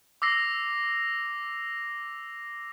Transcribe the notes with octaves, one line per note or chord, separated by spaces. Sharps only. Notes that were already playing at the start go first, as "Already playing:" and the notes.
D6 E6 A#6 C7